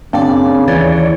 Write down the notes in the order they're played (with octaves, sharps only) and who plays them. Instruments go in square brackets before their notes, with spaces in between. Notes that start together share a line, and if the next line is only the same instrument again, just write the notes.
[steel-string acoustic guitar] F#2 D5 [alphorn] C#3 [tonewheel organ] A#3 C4 D4
[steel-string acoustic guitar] D#2 E3 [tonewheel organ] C#5 D5